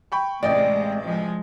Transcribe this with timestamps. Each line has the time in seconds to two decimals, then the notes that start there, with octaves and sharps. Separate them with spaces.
0.12 G5 B5 C#6
0.43 A1 C3 G#3 D5 D#5 G5
1.03 F3 G#3